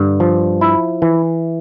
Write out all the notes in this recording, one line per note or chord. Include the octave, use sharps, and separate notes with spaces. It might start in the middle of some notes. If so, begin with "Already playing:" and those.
Already playing: G2 D3
F3
E4
E3